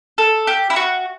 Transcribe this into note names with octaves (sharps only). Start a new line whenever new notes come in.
A4
G4
E4
F#4